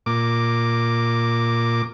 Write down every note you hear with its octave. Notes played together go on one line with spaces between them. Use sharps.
A#2 D6